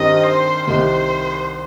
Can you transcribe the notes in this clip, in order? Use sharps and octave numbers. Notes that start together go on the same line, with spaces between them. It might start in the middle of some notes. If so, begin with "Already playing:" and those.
Already playing: G2 D#3 C4 G4 A#4 D#5
C5
C2 C3 D#3 C5